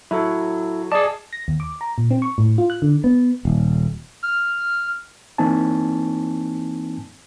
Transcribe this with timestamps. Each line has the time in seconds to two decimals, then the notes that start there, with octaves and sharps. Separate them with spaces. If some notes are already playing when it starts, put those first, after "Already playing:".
0.11 F#3 E4 A4
0.92 G#4 D5 D#5 A5
1.33 A#6
1.48 D#2
1.60 D6
1.81 A#5
1.98 A#2
2.11 C4
2.22 C#6
2.38 A2
2.58 F4
2.70 F#6
2.82 D3
3.04 B3
3.45 D#1
4.23 F6
5.38 E3 A#3 C4 D#4 G#5 A5